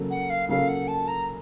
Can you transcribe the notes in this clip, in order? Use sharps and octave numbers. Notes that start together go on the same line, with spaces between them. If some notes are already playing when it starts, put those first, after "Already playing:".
Already playing: C#3 F#3 A#3 C#4 A4
F#5
F5
C#3 F#3 A#3 C#4 A4 F5
F#5
A5
A#5